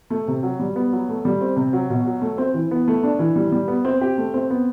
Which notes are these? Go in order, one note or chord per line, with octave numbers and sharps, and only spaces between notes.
A3
C3
F#3
G3
B3
F#3
A3
G3
C4
C3
F#3
B2
F#3
A3
C4
E3
B3
A3
D4
E3
G3
G3
B3
C4
G4
A3
C4
B3